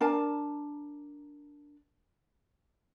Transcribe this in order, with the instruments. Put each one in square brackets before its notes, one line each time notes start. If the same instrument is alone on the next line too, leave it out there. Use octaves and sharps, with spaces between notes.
[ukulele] D4 A#4 A5